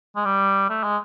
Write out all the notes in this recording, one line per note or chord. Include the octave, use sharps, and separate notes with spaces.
G#3
G3
A3
G#3